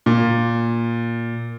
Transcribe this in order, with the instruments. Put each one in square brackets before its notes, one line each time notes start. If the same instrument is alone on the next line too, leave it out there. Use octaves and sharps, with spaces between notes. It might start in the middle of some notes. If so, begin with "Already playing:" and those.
[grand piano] A#2